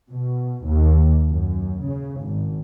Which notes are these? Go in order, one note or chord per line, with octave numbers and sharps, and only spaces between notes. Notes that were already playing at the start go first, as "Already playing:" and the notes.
B2
D#2
F#2
C#3
G#1